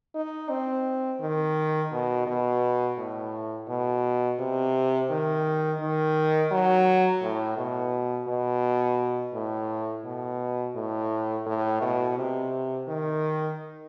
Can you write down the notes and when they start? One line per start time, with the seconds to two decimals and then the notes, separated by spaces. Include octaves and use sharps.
0.15 D#4
0.50 C4
1.20 D#3
1.92 B2
2.27 B2
2.97 A2
3.68 B2
4.39 C3
5.10 D#3
5.80 D#3
6.51 F#3
7.22 A2
7.57 B2
8.28 B2
9.34 A2
10.05 B2
10.75 A2
11.46 A2
11.82 B2
12.17 C3
12.88 D#3